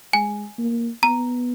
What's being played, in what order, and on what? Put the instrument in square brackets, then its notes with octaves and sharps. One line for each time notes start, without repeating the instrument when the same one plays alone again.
[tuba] G#3 [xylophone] G#5
[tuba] A#3
[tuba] B3 [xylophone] A#5